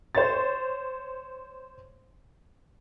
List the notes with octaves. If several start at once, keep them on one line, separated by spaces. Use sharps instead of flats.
C5 C#5 A6